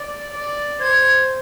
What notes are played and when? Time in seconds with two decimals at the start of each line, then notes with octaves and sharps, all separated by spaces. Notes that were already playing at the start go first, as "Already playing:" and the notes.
Already playing: D5
0.33 D5
0.81 C5 G#6